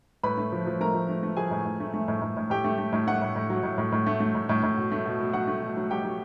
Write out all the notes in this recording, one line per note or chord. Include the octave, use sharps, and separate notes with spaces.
A2 B4 B5
A3
F3
F3
A3 A#4 A#5
F3
A3
A3
F3 G#4 G#5
A2
A2
A3
A3
A2
A2
A2
A2 G4 G5
A3
A3
A2
A3 F#5
A2
A2
F#3
A2
A2
A2
A3
A3
A2
A2
A2
B2
A3
B2
B2
F#3 F#5
A3
B2
F#3
F#3 G4 G5
F#3